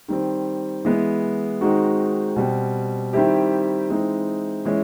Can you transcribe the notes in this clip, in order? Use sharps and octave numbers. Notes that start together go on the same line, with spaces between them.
D#3 G3 C4
E3 G#3 B3
D#3 G#3 C4 D#4 F#4
B2 G3 C4
D#3 G3 C4 E4 G4
E3 G#3 C4 D#4
E3 G#3 C#4